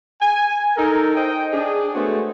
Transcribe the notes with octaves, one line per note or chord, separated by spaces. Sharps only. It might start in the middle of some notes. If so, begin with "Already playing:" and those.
G#5
D#4 A4 A#4
D#4 C5 D#5 G5
D4 G#4
G#3 A3 B3 F#4 C5 C#5